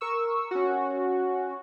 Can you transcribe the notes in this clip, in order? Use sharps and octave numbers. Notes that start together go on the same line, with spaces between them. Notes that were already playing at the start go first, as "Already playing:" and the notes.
A#4 C#6 E6
C#4 F#4